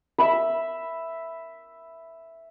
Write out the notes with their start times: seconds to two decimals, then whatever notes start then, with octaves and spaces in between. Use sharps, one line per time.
0.18 E5 B5